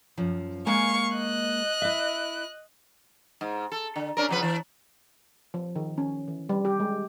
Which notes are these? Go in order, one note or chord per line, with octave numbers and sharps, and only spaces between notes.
F#2 F3
G#3 A#3 F5 G#5 C#6
D#5 F#6
E4 E5
G#2
A4
D3
C#4 D4 A#4
C#3 F3 B4
E3
F3
D#3
C#4
E3
G3
G4
G#3